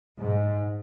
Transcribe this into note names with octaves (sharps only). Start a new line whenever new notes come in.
G#2